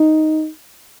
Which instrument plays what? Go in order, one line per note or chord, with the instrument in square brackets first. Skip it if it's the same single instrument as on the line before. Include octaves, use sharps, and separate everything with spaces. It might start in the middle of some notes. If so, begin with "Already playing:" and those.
Already playing: [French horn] D#4